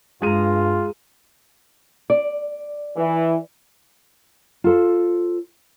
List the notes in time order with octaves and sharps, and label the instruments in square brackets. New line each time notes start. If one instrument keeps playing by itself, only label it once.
[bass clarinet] G2 [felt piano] G#3 D#7 [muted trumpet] F4 [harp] G#4 A#5
[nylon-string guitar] D5
[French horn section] E3
[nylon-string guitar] F4 A4 C5